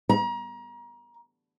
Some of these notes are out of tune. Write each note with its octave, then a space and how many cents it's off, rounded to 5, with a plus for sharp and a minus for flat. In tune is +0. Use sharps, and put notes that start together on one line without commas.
A#5 +30